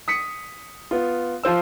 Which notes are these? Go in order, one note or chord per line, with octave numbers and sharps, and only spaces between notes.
D#6 B6 C#7
B3 F4
F3 F4 C5 E6